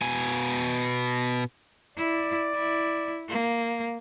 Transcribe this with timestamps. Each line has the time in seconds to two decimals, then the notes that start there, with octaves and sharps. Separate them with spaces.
0.02 B2 G#5
1.97 E4 D5
2.55 E4
3.29 A#3